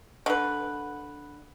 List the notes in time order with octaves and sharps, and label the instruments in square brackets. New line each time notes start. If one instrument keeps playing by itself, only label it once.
[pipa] D3 B4